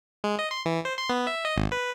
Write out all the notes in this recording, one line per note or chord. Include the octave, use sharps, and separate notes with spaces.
G#3
D#5
C6
E3
C5
C6
B3
E5
D#5
G#1
B4